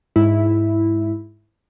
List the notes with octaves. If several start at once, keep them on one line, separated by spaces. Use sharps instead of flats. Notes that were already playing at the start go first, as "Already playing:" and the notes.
G#2 E4